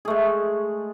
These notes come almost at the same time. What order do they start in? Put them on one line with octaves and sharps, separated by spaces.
G#4 A3 G#3